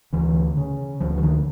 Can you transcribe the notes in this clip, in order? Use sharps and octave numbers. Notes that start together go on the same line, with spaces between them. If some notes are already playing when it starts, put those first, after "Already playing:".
D2 E3
C#3
D2 F3
E3
D#3